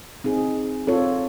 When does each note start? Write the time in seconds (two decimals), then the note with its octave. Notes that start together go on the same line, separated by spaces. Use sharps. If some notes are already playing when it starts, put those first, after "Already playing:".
0.24 C4 D#4 G#4
0.87 C4 F4 A4 C#5